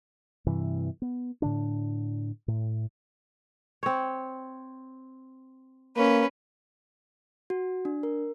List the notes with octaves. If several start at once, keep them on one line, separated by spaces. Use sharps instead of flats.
G2 C3 E3
B3
A2 D3 D4
A2
C4 C#5
A#3 C#4 B4
F#4
D4
A#4